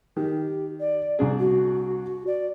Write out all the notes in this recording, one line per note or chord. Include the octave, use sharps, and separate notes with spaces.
D#3 G4
D5
C2 D4 G#4
F#4
D5